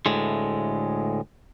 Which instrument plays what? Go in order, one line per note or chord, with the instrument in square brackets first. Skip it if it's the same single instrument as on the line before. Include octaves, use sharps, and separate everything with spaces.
[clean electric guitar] D2 A2 G#3